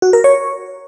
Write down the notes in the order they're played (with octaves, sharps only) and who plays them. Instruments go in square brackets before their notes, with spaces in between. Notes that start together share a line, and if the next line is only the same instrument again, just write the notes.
[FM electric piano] F#4
A#4
C#5